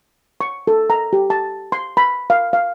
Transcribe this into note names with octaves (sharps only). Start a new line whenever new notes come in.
C#6
A4
A#5
G4
A5
C6
B5
F5
F5